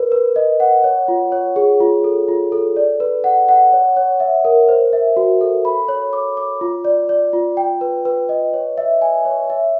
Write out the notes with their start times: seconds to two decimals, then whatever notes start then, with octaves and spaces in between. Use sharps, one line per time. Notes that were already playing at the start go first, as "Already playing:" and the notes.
Already playing: A#4 B4
0.12 B4
0.36 D#5
0.60 F#5
0.84 C#5
1.08 F4
1.32 C#5
1.56 G#4
1.80 F4
2.04 A4
2.28 F4
2.52 A4
2.76 D5
3.00 B4
3.24 F#5
3.49 F#5
3.72 C#5
3.97 C#5
4.20 E5
4.45 A#4
4.69 C5
4.93 E5
5.17 F#4
5.41 A4
5.65 B5
5.88 C#5
6.13 D6
6.37 D6
6.61 F4
6.85 D5
7.09 D5
7.33 F4
7.57 G5
7.81 B4
8.05 B4
8.29 D#5
8.54 C#5
8.78 E5
9.02 G#5
9.25 C#5
9.50 E5